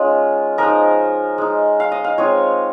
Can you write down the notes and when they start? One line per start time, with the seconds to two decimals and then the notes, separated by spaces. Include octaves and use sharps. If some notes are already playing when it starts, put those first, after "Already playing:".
Already playing: G#3 C#4 D#4 F4
0.58 F3 G#3 D#4 A#4
1.38 G#3 D#4
1.80 F5
1.92 D#5
2.04 F5
2.18 G#3 C4 F4 C#5